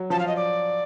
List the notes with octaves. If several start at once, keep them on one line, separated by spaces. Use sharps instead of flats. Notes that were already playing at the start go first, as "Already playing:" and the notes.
Already playing: F#3
F3 A5
F5
D#5
D5